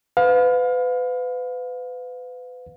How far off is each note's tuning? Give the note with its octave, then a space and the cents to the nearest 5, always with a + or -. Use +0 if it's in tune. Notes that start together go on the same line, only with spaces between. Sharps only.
B4 +30 F5 +30